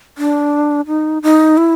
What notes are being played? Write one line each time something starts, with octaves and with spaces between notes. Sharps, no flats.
D4
D#4
D#4
E4